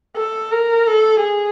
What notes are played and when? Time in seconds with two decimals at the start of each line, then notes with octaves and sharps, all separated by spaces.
0.17 A4
0.52 A#4
0.87 A4
1.22 G#4